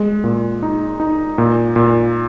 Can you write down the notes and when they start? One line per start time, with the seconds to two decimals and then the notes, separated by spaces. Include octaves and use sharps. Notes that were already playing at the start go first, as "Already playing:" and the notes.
Already playing: G#3
0.24 A#2
0.63 D#4
1.00 D#4
1.38 A#2
1.76 A#2